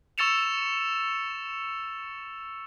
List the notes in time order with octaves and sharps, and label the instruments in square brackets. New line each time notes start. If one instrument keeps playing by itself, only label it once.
[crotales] C#6 E6 A6 C#7 E7 F7